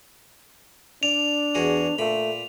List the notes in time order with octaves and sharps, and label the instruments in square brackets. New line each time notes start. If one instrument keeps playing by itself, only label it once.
[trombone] D4 [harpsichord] D5 [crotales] F7
[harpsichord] E2 F#4 G#4
[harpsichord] A#2 B5 [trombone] A3